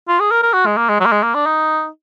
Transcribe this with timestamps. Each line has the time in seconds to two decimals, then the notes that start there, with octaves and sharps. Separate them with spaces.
0.08 F4
0.20 G#4
0.31 A#4
0.43 A#4
0.54 F#4
0.66 G#3
0.77 A#3
0.89 G#3
1.00 F#3
1.06 A#3
1.12 G#3
1.23 A#3
1.34 D4
1.46 D#4